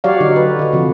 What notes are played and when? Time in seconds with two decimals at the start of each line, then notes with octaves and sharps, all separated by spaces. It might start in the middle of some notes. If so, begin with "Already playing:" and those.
0.04 F#3 F#4 G4 C#5 D5 F5
0.20 D3 F#3 D#4
0.36 B4
0.59 D3 F#4
0.73 C3 F3